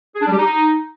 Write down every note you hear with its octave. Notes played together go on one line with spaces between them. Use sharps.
G#4
D4
G3
G4
D#4